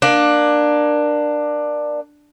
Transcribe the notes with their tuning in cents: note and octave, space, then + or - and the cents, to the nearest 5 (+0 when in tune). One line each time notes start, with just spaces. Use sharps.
A#3 +20 D4 +15